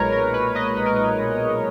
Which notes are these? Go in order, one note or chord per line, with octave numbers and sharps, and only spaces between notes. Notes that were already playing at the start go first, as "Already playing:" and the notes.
Already playing: B1 A#2 G#3 A#4 B4 C#5
A#4
G#3 B4
B4 D#5
B1 B4
A#4
B4
G#3